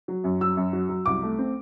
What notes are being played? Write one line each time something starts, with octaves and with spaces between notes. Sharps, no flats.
F#3
F#2
F#3 E6
F#2
F#3
F#3
C2 D6
A3
C4